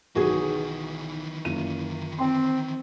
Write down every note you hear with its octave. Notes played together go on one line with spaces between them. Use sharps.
B1 D#3 E3 B3 F#4 G#4
F#1 F4 D#7
C4 C5 C6